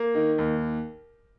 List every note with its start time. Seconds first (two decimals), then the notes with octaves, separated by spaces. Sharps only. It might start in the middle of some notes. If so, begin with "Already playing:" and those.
Already playing: A#3
0.15 D#3
0.38 D#2